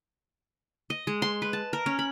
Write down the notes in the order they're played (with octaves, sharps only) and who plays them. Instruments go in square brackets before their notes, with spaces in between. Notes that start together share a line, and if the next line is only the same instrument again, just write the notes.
[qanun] D#5
G#3
C6
B4
A5
A#4
C#4
B5